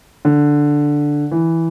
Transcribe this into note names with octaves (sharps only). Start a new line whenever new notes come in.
D3
E3